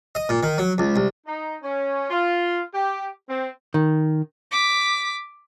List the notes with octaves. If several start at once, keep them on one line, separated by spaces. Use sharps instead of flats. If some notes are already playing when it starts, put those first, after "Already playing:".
D#5
A#2
D#3
F#3
C#2
C2
D#4
C#4
F4
G4
C4
D#3
D6 B6